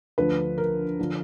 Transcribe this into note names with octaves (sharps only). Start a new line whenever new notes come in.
D2 D3 F3 B4
A#4
D3 F3